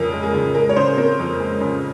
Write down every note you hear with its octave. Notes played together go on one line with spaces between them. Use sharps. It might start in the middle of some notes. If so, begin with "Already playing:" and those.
Already playing: F2 C#3 C#4 A#4
G#3
G#4
C#3
G#3 A#4
C#5
C#3 C5
C4 A#4
F2
G#3
C#3